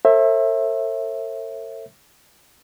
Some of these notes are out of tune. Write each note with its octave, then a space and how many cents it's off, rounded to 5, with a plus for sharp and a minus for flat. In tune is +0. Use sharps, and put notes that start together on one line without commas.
A4 +45 C5 +45 E5 +0